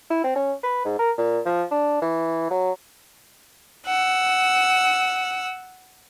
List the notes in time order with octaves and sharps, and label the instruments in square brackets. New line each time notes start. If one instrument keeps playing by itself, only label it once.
[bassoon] E4
C4
C#4
B4
G#2
A#4
A#2
F3
D4
E3
F#3
[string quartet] F#5 E6